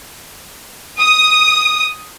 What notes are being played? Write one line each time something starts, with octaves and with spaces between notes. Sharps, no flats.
D#6